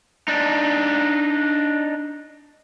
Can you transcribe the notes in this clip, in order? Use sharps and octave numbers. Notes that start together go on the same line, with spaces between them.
D4 D#4